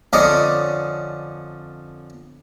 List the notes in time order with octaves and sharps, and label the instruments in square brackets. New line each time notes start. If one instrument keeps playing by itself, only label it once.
[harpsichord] F2 D3 C#4 D5 D#5 D6